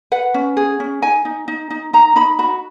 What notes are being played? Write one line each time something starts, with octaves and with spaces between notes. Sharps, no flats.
B4 F#5
C#4
G#4
C#4
D#4 G#5
D#4
D#4
D#4
D#4 A#5
D#4 B5
F#4 B5